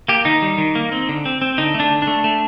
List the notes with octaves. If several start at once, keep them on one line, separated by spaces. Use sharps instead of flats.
A#3 G4
D#3 D#4
G3
D#3
A#3
C4
D3
C4
C4
D3 D#4
A3
D4
D3
D4
A3
A3